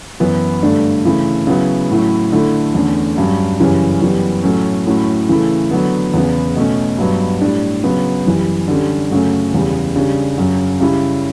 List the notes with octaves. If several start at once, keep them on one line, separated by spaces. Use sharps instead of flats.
F#2 E3 B3 E4
G2 D3 A3 D4
C#3 E3 A3 E4
C#3 F#3 B3 E4
A2 F#3 C#4 E4
D3 A3 E4
E2 D3 A3 C#4
G2 F#3 C#4
F#2 C#3 E3 G3 C#4
F#2 E3 G3 B3
A2 F#3 A3 C#4
A2 F#3 C#4 E4
C#3 E3 A3 E4
D3 F#3 B3
E2 C#3 E3 B3
B2 A3 C#4
G2 F#3 B3
A2 G3 D4
C#3 F#3 B3
F#2 E3 G3
D3 G3 C#4
F#2 C#3 F#3 A3 C#4
E2 C#3 G3
C#3 G3 D4
F#2 C#3 F#3
C#3 G3 C#4 E4